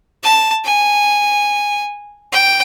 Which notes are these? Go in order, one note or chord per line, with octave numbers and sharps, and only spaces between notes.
A5
G#5
G5